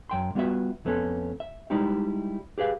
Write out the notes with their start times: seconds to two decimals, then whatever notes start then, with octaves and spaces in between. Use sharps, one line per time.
0.09 F#2 G5 C6
0.35 G3 B3 F4 F#4 B4 E5
0.85 F2 A3 B3 C#4 A4
1.40 E5
1.70 G3 G#3 D#4 E4 G4
2.58 G4 G#4 B4 F5